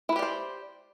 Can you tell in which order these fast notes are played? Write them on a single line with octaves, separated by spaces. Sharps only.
E4 B4 G4 D5 C5